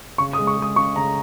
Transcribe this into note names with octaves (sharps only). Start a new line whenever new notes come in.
C#3 C#6
D#6
G#3
C#6
G#3
D#6
C#3 C#6
C#3 A#5